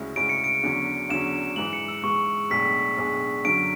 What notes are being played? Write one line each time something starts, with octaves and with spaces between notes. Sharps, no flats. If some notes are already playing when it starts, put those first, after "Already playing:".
Already playing: D2 C#3 G#3 C#4 E4
D2 C#3 G#3 C#4 E4 D7
C#7
D7
E2 D3 F#3 C#4
E2 D3 F#3 C#4 E7
G#2 E3 G#3 F#7
C#7
E6
G#2 E3 G#3 C#6
B1 A2 G#3 D4 G#4 B6
B1 A2 G#3 D4 G#4
F#2 D3 F#3 C#4 D7